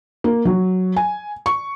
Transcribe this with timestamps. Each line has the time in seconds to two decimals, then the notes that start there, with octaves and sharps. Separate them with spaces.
0.24 A#3
0.45 F#3
0.96 G#5
1.46 C#6